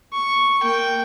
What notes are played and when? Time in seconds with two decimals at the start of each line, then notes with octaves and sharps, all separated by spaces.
0.13 C#6
0.62 A#3 G5